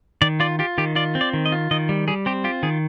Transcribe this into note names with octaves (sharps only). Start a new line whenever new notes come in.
D#3 D5
F4 D5
F4 G4
D#3 G4
F4 D5
C4
D5
D#3
D#5
F4
D#3 D#5
G3
G3 G#4
C4 G4
F4 G4
D#3 G#4